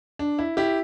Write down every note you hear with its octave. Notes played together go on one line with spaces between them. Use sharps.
D4
E4
E4 G4